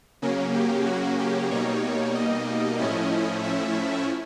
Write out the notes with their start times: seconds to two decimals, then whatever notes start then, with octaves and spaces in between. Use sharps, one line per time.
0.22 C#3 F#3 A#3 C#4
0.54 G4
0.86 F#4
1.19 G4
1.51 B2 G3 A#3 D#4 C#5
2.15 D#5
2.79 A2 F3 A3 C#4 E4
3.44 E5